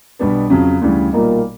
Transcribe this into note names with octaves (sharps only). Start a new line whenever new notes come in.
B1 B2 G3 B3 D4
F2 C#3 F#3
D2 C#3 E3 G3
B1 A#2 G3 A#3 D#4